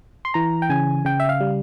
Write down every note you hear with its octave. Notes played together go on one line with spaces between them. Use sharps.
C6
E3 A#5
G5
C#3 G#5
C#3 G5
E5
F5
G3